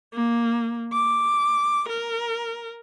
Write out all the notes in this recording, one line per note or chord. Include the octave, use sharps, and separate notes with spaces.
A#3
D6
A#4